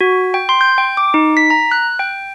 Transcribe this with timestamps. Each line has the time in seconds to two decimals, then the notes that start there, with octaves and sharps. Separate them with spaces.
0.01 F#4
0.34 G5
0.49 C6
0.61 G6
0.78 G5
0.97 D6
1.14 D#4
1.37 B6
1.50 A#5
1.71 F#6
1.99 G5